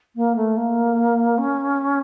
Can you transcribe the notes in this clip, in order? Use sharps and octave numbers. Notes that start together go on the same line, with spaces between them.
A#3
A3
A#3
C#4